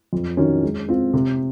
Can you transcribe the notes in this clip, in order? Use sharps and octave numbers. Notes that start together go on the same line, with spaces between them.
F2
D#3 F#3 C#4
G#3
C4 F4
C3